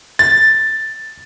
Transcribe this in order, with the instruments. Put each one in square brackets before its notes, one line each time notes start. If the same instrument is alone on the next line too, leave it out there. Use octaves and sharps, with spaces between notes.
[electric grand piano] A6